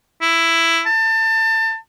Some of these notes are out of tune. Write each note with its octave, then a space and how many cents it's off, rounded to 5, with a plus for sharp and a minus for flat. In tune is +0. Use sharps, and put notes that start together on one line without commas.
E4 +10
A5 +25